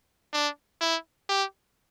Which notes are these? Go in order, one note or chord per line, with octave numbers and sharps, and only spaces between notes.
D4
E4
G4